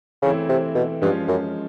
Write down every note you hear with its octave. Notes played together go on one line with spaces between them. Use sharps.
C#3 E3 A3 C4 E4
C3
B2
G2 F3 G#3 C#4 F4
F#2